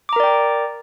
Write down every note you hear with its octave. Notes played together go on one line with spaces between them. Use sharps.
A#4 D5 G5 A#5 D6